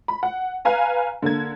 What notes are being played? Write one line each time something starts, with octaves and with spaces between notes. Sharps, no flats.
B5
F#5
B4 F5 G#5 A#5
D3 A#3 G#6